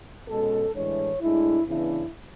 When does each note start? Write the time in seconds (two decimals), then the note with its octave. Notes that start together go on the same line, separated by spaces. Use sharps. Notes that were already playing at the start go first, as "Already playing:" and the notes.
0.29 B2 G#3 C#4 A4
0.74 A2 E3 G#3 D4 C#5
1.21 A2 G#3 D4 E4
1.66 C#3 E3 B3 D4 E4